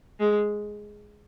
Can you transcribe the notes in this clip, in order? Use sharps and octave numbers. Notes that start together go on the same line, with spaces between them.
G#3